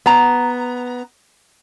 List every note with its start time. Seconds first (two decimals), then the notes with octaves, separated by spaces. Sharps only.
0.06 B3 A#5